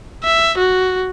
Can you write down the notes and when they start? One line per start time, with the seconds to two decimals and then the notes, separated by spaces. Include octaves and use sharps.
0.24 E5
0.58 F#4